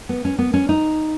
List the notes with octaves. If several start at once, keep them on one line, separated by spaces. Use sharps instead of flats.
B3
C#4
B3
C#4
D#4